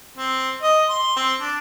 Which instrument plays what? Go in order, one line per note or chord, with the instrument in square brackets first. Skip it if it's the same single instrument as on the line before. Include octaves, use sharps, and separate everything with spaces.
[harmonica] C4
D#5
C6
C4
D4